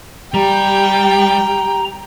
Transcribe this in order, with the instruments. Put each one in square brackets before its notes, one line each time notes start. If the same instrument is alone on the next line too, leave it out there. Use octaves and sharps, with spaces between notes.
[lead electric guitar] G3 [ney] G4 [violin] G5 [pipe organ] A#5